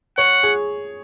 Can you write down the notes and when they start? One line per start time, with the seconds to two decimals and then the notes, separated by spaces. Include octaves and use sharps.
0.18 C#5 F#5
0.43 G#4